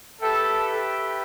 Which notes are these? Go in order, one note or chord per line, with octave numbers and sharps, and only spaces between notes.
G4 A4 B4 E5 G5